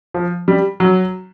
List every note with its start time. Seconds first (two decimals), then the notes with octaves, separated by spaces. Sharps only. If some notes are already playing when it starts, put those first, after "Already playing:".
0.14 F3
0.48 G3
0.80 F#3